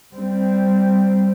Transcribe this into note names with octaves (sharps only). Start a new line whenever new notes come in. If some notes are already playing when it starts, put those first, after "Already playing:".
G3 C4